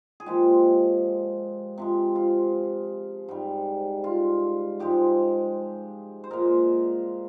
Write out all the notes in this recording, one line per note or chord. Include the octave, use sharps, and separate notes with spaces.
G#4
A#2 F3 G#3 G4
C3 F3 G#3
F4
G#2 G3
F4
G#2 F3 G#3 G4
C5
A#2 G#3 A#4